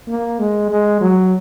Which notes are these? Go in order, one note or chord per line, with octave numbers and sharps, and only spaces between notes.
A#3
G#3
G#3
F#3